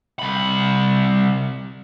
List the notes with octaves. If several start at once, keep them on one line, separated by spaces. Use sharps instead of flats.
C2 B5